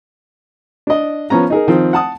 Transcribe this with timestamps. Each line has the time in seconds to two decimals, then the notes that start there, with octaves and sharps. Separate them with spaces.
0.87 D4 D#5
1.30 F3 B3 C#4 A#5
1.50 D#4 G#4 A#4
1.68 D#3 F3 C4
1.93 F#5 A5 D#6